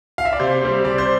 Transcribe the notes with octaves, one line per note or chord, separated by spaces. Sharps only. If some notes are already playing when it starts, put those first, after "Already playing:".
F5
E5
D5
C3 C5
G3 C4
C3 D5
C5